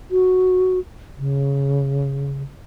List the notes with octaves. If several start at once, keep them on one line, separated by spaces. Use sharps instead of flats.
F#4
C#3